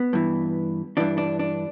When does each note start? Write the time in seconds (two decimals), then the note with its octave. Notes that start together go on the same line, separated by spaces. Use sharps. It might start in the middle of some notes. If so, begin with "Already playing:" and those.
Already playing: B3
0.13 G2 E3
0.97 G2 E3 D4
1.18 D4
1.39 D4